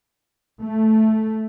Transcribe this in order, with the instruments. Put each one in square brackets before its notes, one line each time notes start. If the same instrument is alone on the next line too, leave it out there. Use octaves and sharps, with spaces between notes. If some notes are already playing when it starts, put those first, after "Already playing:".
[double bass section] A3